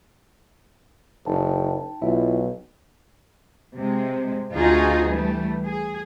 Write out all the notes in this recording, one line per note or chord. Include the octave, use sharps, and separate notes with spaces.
F#1 D#4 G5 A5
B1 E4 F4 E5
C3 G#3
D2 D#4 F4 F#4 G#4
E3 G3 A3
G#4